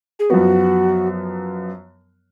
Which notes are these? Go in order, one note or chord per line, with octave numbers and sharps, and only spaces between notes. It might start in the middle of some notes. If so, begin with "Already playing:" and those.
G#4
F#2 F3 B3 F#4